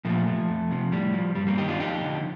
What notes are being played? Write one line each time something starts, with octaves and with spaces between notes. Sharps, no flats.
A#2 F3 A3
F3
F2
C3 F3
A2 G3
F3
G2 G3
G3 A#3
D#3 D#4 G4
D4 F4
F2 D#4 G4
D3 F3